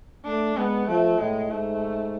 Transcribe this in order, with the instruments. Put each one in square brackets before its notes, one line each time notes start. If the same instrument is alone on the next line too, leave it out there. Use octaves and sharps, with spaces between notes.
[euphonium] A3 [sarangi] D4
[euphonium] G#3 [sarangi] B3
[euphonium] F3 [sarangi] A3
[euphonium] A2 [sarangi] G#3
[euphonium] G#2 [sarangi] A3